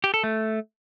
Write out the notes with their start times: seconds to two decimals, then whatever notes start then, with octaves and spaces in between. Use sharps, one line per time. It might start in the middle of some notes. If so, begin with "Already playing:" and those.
0.04 G4
0.14 A4
0.24 A3